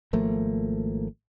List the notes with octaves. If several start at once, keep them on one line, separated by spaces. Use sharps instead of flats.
G#1 F3 A3 A#3